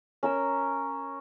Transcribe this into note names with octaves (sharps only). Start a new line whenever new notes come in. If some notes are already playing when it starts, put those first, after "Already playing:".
C#4 A#4 E6